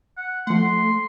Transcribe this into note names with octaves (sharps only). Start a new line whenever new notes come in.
F#5
F3 A3 F#5 C6